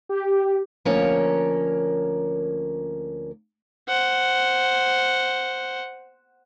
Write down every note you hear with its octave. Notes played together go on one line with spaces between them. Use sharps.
G4
D2 F3 A#3 C#4 A#4 C#5
C5 F#5